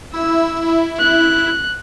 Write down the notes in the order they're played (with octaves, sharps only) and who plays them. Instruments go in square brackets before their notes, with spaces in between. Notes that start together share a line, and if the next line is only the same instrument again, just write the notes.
[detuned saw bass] E4 [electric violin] E6
[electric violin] F#6